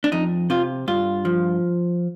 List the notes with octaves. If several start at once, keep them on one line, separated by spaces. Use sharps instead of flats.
D4
F2 D#4
C3 F4
G2 F4
F3